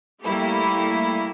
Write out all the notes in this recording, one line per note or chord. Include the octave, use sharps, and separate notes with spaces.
G3 A3 A#3 E4 G4